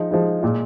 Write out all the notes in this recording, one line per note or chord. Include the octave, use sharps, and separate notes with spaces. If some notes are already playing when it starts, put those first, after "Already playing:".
Already playing: F3 G#3 D#4
F3 G#3 D#4
A#2 G#3 F4